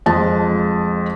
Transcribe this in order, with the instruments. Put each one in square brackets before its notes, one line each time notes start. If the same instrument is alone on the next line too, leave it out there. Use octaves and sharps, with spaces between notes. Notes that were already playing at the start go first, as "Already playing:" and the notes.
[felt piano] F2 G#3 A5